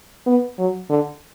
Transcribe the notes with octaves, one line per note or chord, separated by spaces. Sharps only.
B3
F#3
D3